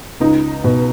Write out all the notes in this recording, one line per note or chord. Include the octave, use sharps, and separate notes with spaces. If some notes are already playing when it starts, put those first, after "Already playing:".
C#2 D#4
B2